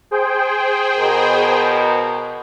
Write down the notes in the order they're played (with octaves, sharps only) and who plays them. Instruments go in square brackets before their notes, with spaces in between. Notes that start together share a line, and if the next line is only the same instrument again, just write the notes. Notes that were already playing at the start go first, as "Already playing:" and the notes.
[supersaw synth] G#4 C5 G5
[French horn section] B2 A#4